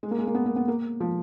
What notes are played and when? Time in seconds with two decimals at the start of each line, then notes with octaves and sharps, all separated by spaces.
0.03 G#3
0.11 A#3
0.18 G#3
0.27 A#3
0.35 B3
0.46 A#3
0.56 B3
0.68 A#3
1.00 F3